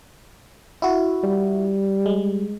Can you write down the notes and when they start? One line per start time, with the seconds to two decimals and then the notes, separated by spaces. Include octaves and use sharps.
0.82 E4 F#4
1.24 G3
2.06 G#3